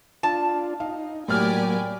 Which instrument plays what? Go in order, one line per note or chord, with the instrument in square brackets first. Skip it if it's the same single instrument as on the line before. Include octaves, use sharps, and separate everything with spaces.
[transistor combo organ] D4 F4 [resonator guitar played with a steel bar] A5
[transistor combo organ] D#4 [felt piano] F5
[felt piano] A2 F6 [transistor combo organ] F#3 A#3 [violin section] G4 D5 G#5